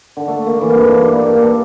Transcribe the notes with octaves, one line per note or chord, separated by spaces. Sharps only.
D3
A3
A#3
E3
G2
D4
B4
A#3
D4
A4